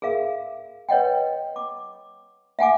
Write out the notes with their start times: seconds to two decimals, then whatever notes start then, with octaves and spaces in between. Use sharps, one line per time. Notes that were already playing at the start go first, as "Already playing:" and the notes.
0.02 G#4 A#4 E5 F5
0.89 B4 C#5 D#5 F#5 G5
1.56 D6
2.59 E5 F#5 G#5 D6